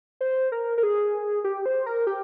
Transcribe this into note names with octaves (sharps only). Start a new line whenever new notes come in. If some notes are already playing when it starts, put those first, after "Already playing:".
C5
A#4
A#4
G#4
G4
C5
A#4
G4